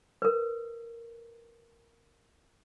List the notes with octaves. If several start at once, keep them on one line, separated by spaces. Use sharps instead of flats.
A#4 B4